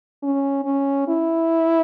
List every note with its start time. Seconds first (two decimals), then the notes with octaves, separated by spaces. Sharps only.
0.23 C#4
0.65 C#4
1.08 E4